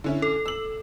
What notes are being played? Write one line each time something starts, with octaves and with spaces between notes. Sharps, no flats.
D3 C#4 E4
A4
E6 F#7